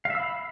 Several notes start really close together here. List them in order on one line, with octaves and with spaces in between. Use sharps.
F5 E5 E6 B5